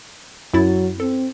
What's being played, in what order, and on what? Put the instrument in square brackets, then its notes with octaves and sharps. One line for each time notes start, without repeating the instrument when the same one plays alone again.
[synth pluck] F#2 E4 A6 [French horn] F#3
[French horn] C4 [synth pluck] A4